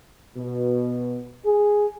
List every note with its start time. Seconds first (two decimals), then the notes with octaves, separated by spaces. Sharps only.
0.36 B2
1.45 G#4